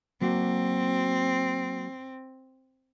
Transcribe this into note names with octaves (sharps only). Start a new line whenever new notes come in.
F#3 A#3 C4 F#4